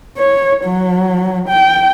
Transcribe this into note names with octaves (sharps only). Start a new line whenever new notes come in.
C#5
F#3
G5